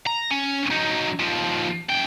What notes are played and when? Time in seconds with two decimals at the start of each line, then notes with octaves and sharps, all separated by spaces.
0.07 A#5
0.31 C#4
0.71 F#3 D#4
1.20 D#2 F3
1.89 F#2 G5